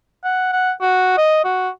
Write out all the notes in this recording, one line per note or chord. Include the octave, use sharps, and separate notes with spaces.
F#5
F#5
F#4
D#5
F#4